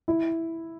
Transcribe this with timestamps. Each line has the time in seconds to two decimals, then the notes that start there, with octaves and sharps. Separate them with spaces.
0.08 E4